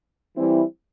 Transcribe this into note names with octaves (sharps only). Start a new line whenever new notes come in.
E3 G3 C4 E4